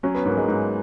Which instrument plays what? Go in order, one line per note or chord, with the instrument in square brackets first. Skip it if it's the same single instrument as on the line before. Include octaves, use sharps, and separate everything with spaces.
[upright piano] F#3 [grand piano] C#4
[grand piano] B3
[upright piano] G#2 [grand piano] A#3
[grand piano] G#3
[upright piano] G#2